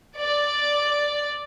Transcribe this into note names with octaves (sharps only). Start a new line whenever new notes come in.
D5